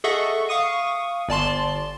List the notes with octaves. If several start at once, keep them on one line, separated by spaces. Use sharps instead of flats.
G#4 A4 D#5 E5 F#5 C#6
F5 C#6 D#6 D#7
G1 D5 A5 C6